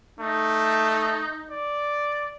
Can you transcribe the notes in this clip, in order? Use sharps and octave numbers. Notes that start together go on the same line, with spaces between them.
A3 D#4
D5